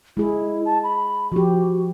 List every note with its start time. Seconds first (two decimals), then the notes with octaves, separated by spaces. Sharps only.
0.17 G#3 E4 G#4
0.65 A5
0.84 B5
1.32 F3 F#4 G4